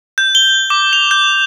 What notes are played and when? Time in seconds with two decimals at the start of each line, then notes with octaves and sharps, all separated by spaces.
0.18 G6
0.35 G7
0.70 D6
0.93 F7
1.11 G6